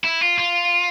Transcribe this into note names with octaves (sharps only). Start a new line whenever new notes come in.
E4
F4
F4